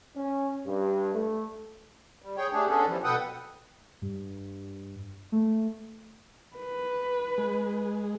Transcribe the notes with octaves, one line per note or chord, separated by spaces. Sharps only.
C#4
G2
A3
G3
G#4 C#5 G5
A3 D4 G4 G#4
B3 C#4 D4 G#4 A4
E3 F3 G3
B2 A4 B4 F#5 G5 D#6
G2
A3
B4
G#3